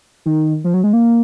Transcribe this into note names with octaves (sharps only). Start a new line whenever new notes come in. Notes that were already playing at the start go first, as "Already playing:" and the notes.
D#3
F3
F#3
G#3
A#3